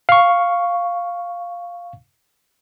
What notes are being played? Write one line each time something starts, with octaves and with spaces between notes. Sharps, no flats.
F5 C#6